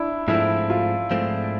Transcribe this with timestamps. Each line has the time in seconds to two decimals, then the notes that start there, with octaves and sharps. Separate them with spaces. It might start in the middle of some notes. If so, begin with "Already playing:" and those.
Already playing: D4 E4
0.28 G#2 F3 A3 C4 E4
0.70 F4
1.11 G#2 F3 A3 C4